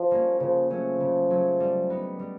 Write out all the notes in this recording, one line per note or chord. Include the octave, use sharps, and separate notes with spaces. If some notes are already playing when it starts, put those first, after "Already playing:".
Already playing: F3
G3 A#3 C#4
C#3 F3
F3 F#3 A3 C#4
C#3
F#3 A3 C#4
G3
B3 D#4
G3